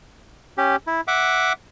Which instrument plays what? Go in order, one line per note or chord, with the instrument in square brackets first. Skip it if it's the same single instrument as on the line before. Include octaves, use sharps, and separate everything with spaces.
[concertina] C#4 G4
E4
E5 F#5 D6